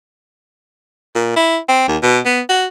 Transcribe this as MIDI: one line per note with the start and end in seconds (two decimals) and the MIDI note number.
1.15 1.34 46
1.36 1.58 64
1.68 1.86 60
1.88 1.97 39
2.02 2.19 47
2.25 2.41 59
2.49 2.66 66